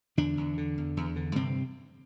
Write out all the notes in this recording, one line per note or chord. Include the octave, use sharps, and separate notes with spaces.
E2 D3 D4
E2
D3
E2
E2
D3
G2 C3 C4